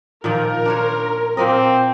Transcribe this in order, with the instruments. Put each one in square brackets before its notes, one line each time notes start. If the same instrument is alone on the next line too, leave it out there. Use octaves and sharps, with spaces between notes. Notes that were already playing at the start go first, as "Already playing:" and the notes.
[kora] A#2 D#3 F3 [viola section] A#4
[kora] D4 C5 C#5
[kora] A#2 A#3 D#5 [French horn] C4